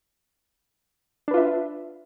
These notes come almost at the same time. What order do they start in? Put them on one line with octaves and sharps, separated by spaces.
D4 B4 F4 E5